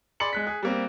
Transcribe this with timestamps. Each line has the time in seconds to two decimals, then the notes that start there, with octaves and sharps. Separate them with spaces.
0.20 G#4 D5 B5 C6 C#7 F#7
0.33 G#3 F#6 B6
0.47 G#4
0.63 G3 A#3 C4